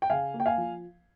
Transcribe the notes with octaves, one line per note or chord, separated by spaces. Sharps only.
G5
C#3 F5 G#5
A#3
G5
F5 G#5
F3